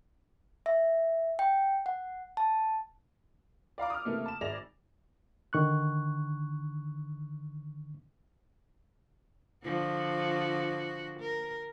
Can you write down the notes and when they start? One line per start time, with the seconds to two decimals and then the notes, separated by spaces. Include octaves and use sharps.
0.66 E5
1.39 G5
1.86 F#5
2.37 A5
3.78 D5 F5 A#5 D6
3.90 D#6 F6
4.05 C3 E3 A3 A#3
4.26 A5 E7
4.41 G#1 G#4 D5 E5 A#6 F7
5.53 D3 D#3 C#6 F#6
9.64 D3 F3 F#4
11.19 A#4